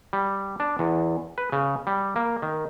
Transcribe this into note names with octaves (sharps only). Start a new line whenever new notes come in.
G3
D4
E2
B4
C#3
G3
A#3
D#3